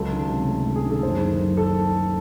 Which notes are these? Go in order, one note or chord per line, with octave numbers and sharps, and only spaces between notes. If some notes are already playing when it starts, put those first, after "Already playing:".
Already playing: C#2 F#3 A4
D#3
C3
A3
C#2
G#4
D#3
A4
F#1 C5
D#3
F#2
A4